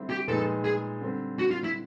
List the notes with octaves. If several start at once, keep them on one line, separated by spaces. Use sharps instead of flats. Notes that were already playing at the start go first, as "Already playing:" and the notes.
Already playing: D3 G3 C4 E4
G4
A#2 F3 G#3 B3 D#4 A4
G#4
D3 G3 C4
F#4
F4
E4